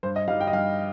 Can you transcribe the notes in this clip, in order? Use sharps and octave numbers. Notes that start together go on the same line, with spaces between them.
G2 C5
D#5
G3 D#4 F5
G5
D#5
G2 F5